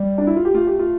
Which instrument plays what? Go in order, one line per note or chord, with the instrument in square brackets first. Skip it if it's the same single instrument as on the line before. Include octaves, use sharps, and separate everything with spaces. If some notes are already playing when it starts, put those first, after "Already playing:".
Already playing: [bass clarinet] G3
[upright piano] D4
E4
F4
G4
[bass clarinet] A3 [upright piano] F4
[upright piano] G4
F4